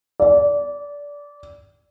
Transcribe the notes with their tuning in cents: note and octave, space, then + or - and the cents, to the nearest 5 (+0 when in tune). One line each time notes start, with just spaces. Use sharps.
D5 -20